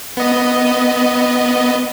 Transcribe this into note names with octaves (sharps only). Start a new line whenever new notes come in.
B3 D#5